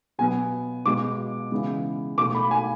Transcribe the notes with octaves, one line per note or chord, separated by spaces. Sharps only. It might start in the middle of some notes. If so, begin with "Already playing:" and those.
B2 F#3 B3 G#5
B2 G#3 B3 D6
C#3 E3 G#3 B3
B2 A3 D6
B5
G#5